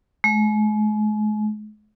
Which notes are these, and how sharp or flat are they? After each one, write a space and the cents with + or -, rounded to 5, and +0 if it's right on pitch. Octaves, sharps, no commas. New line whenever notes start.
G#3 +40